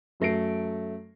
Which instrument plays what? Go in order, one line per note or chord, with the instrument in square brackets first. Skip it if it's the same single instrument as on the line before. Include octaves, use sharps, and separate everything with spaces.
[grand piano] F#2 F#3 A3 A#6 C7 D7